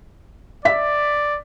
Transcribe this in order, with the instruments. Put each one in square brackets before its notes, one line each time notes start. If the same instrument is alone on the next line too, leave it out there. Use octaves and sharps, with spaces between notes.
[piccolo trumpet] D5 [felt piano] E5 B6